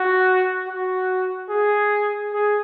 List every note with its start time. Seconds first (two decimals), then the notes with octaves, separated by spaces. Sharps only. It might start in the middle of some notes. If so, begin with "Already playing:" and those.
Already playing: F#4
0.68 F#4
1.50 G#4
2.33 G#4